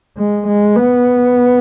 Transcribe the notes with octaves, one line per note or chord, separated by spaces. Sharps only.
G#3
G#3
B3